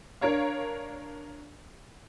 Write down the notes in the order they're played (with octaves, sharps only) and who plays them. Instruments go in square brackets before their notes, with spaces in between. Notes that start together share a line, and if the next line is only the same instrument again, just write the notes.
[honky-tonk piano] D4 A#4 C#5 F5